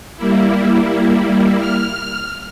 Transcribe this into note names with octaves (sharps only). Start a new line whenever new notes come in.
G3 A#3 E4
F6